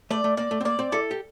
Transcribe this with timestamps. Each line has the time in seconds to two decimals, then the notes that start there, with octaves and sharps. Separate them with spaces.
0.11 A3 D5
0.24 A3
0.37 A#3 D5
0.51 A3
0.61 C4
0.65 A#3 D5
0.79 C4
0.92 E4 A4
1.11 G4